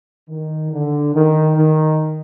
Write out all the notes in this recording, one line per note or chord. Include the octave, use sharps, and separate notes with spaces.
D#3
D3
D#3
D#3